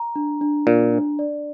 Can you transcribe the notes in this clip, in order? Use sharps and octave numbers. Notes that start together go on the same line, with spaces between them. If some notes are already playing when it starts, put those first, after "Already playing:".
Already playing: A#5
D4
D4
A#2 D4
D4
D5